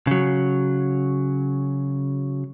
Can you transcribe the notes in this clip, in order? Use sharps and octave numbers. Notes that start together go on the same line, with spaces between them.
C#3 F#3